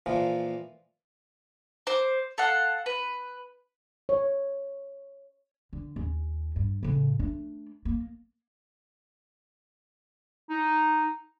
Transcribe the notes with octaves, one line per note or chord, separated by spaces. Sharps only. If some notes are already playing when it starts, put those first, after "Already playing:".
A#2 E3 F3
C5 D6
A4 F5 F#5
B4
C#5
D3
D#2 C#4
G2
A2 C#3
A3 D4
A#3
D#4